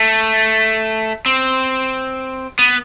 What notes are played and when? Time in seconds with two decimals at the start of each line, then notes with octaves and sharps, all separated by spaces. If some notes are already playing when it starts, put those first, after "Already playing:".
Already playing: A3
1.26 C4
2.59 B3